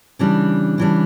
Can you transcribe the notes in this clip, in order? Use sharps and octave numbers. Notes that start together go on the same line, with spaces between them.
C#3 E3 G3 D4
C#3 E3 G3 D4